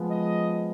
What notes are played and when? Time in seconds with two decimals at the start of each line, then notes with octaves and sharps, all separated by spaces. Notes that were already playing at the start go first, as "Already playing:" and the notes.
Already playing: F3 G#3 B3
0.11 D#5